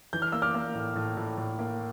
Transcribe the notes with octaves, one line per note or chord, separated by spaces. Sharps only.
E3 G6
F6
A#3 E6
D6 F6
A#3
A2
A2
A2
A2
A#3